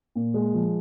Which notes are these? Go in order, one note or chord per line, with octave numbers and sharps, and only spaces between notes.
A#2
G#3
F3